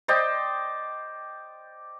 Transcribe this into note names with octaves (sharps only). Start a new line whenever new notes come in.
C5 D5 D#5 G5